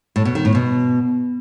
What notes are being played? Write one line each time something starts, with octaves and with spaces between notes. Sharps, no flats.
A2
B2
D#3
A2
B2